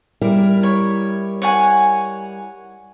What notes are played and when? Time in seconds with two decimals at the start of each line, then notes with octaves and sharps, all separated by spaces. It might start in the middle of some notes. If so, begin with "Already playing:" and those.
0.21 G3 E4 A#4
0.63 C#5
1.42 C#5 F#5 G#5